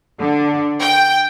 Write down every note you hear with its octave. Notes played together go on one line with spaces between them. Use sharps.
D3
G5